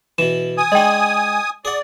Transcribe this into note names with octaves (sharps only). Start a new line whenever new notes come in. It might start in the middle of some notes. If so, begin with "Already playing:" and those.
B2 E3 E7
G#5 D#6
G#3 D4 D#5 G5
G#4 D5 F#5